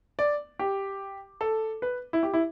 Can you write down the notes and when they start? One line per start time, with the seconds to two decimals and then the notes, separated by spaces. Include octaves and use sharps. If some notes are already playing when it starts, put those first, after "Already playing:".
0.19 D5
0.59 G4
1.41 A4
1.82 B4
2.13 E4
2.23 G4
2.33 E4